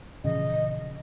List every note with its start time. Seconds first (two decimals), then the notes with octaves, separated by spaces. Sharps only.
0.24 A#2 C#3 E3 F3 D#5